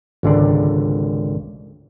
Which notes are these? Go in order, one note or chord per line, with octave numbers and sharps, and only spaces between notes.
G#1 C#2 D3 D5